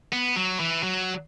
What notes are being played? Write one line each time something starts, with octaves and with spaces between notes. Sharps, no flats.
B3
F#3
E3
F#3